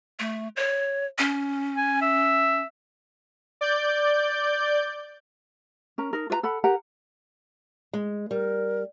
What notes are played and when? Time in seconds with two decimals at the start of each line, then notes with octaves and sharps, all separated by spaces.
0.20 A3
0.56 C#5
1.18 C#4
1.77 G#5
2.02 E5
3.61 D5 G6
5.98 C#4 A#4 A#5
6.13 D#4 A#4
6.30 F4 B4 D5 A#5
6.43 A4 F#5 B5
6.64 G4 A#4 F#5 A#5
7.93 G#3
8.31 G3 A#4